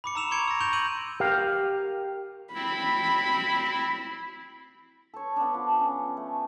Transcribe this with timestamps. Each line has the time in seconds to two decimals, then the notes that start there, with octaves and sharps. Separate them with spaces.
0.04 B5 D6 C#7
0.15 A#5 B5 E6 E7 F7
0.31 C6 C#6 G#6 C#7 D7 F7
0.48 E6 A#6
0.60 C6 C#6 G6 D7 F7
0.73 C6 E6 G6 D7 D#7 F#7
1.20 G4 A#4 F5
2.54 C4 E4 B5
5.14 A4 C#5
5.36 B3 D4
5.54 F3
5.80 C#4
6.17 A3